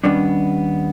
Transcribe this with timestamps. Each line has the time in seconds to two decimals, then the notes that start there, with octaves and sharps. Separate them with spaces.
0.04 D#2 G3 B3 C#4 D4